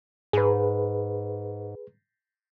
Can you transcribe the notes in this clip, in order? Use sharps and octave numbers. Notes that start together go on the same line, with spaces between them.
G#2 G#4 B4